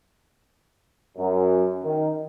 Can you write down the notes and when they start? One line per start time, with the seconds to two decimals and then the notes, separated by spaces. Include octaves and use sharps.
1.18 F#2
1.84 D#3